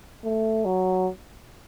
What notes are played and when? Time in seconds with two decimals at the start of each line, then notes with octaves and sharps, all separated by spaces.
0.24 A3
0.65 F#3